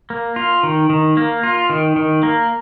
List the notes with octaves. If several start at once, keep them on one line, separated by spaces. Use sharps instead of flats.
A#3
F4
D#3
D#3
A#3
F4
D#3
D#3
A#3